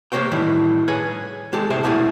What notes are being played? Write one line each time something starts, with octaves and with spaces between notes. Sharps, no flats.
A#3 G4 A4 C5 C#5 G5
A2 D#3 E3 G3 E4
G#4 B4 C#5 G#5
G#3 G4 A4
D2 A2 C3 G4 C5 E5
C2 B2 A3 E4 G4 G#4